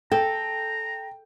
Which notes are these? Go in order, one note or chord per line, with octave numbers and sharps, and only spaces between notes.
A4 G5 A#5